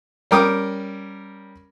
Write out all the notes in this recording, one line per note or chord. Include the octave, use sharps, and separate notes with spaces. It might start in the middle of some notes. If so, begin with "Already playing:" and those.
G3 C#4 A#4 G5 D6 D#6